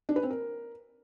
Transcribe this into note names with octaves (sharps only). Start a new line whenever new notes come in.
D4
B4
C4
A#4